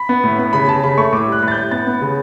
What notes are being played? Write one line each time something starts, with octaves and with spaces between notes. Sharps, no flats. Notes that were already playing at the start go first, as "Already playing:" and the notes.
Already playing: B5
B3
A2
B3
C#3 B5
C#3 A5
C#3 B5
A3 C#6
A2 D6
G3
F#6
A2
A6
G6
A2
B3 A6
B3
C#3